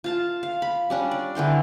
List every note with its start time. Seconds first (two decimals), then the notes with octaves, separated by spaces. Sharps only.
0.04 F4 F5 A5
0.43 F5
0.62 B5
0.90 G3 C#4 D4
1.11 D5
1.35 D3 E3 G5 C6